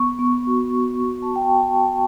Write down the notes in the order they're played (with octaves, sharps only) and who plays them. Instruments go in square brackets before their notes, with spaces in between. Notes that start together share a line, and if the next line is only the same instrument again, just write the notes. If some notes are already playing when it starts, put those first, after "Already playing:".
Already playing: [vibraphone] B3 C#6
B3
F#4
F#4
B3
A5
B3 G5
A5
F#4 A5
A5
F#4